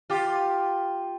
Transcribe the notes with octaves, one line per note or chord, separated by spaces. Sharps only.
F4 G4